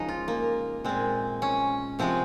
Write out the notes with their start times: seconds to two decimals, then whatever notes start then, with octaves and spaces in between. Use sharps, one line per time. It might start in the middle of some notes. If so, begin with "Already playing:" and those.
Already playing: C#3 F3 G#3 D#4
0.08 F4
0.28 A#3
0.84 A#2 G#3 C4
1.42 C#4
1.99 C3 F3 G#3 C4